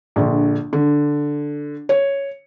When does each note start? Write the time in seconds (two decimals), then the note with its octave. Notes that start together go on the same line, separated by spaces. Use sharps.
0.16 A#1 D3
0.73 D3
1.89 C#5